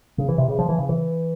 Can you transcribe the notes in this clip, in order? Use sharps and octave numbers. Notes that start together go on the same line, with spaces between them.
C#3
E3
C3
C#3
F3
E3
C#3
E3